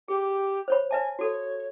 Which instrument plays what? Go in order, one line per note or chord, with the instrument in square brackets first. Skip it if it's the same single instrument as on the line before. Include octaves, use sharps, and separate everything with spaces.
[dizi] G4 [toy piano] G#4
[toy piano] C5 C#5 B5
[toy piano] B4 E5 A5 [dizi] G#5
[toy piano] F#4 A4 [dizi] C#5